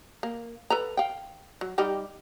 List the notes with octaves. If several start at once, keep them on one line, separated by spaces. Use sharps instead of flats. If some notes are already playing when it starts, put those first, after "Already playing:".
A#3
A4 B4 A#5
F5 G5
F#3
G3 D#4 G4